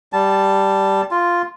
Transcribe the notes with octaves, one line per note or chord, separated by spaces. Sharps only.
G3 A5
F4